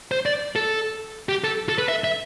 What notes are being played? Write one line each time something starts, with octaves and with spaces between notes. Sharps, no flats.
C5
D5
A4
G4
A4
A4
B4
E5
E5